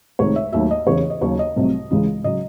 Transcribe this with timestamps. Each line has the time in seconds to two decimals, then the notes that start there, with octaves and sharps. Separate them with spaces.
0.19 C#2 C3 D#3 A3 C#5
0.36 E5
0.53 D#2 D#3 F#3 A3 E5
0.71 D#5
0.87 E2 C#3 E3 C#5
1.10 D#5
1.21 D#2 C#3 F#3 C#5
1.39 D#5
1.56 C2 C3 F#3 A3
1.91 C#2 C#3 E3 G#3
2.24 C#3 F#3 D#5